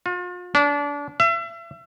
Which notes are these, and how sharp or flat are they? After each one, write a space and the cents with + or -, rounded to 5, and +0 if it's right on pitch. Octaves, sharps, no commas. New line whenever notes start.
F4 +40
D4 -30
E5 +35